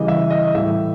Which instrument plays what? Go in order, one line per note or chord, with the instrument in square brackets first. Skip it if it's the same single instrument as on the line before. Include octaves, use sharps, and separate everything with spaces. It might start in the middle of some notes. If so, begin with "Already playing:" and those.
Already playing: [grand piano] C#3 E3 G3 D#5
E5
D#5
A2 E3 G3 E5